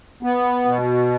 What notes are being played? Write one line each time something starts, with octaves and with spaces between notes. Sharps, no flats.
B3
B2